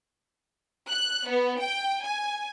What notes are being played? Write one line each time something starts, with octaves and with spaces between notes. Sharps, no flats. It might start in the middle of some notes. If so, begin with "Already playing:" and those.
F#6
B3
G5
G#5